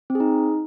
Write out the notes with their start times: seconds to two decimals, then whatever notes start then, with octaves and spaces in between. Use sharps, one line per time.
0.10 C4
0.15 G#4
0.20 D#4